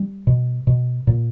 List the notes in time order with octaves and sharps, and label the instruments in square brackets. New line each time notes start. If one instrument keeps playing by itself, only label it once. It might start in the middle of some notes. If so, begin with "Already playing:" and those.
Already playing: [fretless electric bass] G3
B2
B2
A#2